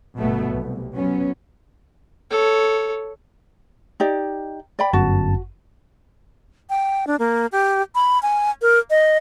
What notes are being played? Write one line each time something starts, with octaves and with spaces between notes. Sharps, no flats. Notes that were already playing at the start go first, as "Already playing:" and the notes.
G1 B2 F#3 A3 B3
C2
F#3 B3 C#4
A4 C#5
D#4 G4 D5
D5 G5 B5
G1 F#2 F#4 A5
G5
D4
A#3
G4
B5
G#5
A#4
D#5